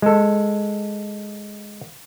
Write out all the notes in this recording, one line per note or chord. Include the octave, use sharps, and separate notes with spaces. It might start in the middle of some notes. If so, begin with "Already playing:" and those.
G#3 A4